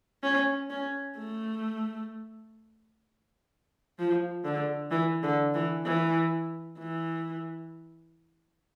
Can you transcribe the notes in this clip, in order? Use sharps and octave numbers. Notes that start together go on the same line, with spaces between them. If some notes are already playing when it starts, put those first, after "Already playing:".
C#4
C#4
A3
F3
D3
E3
D3
E3
E3
E3